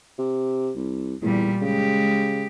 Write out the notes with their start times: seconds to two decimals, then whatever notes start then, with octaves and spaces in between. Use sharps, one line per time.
0.19 C3
0.76 C2
1.23 E2 A#2 G3
1.62 C#3 G#3 G4